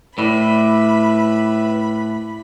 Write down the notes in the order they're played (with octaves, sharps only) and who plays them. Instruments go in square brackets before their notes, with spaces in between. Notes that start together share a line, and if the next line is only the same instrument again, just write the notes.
[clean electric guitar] A2 [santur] E4 D5 [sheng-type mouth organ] B4 E5 [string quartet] B5